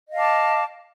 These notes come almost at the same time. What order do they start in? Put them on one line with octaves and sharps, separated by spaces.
D#5 F5 A5 D6